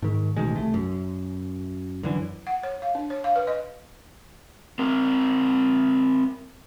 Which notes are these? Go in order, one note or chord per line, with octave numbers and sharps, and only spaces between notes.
G#2 D#3
A1 B2 D#3 G#3
C2 A3
F#2
F#2 D3 E3
F#5
C#5
F5
D4
C#5
F5
B4
D#5
C4 A#4